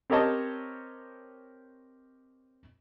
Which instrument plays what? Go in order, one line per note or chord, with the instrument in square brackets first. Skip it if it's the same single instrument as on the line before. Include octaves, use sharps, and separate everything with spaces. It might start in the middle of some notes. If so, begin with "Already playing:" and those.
[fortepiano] C4 G4 A#4 C#5 D#5 A5